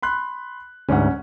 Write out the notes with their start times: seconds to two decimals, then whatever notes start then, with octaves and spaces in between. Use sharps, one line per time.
0.02 B5 C6 F#6
0.89 D2 G#2 C#4 F#5